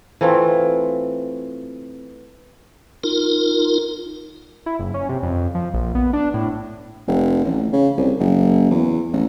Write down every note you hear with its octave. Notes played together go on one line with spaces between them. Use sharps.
E3 A3 C4 F4
D#4 F4 A#4
E4
F#1
C#4
C3
F2
F3
A#1
B3
D4
A2
F1
A1
C#3
C2
F#1
E2
A1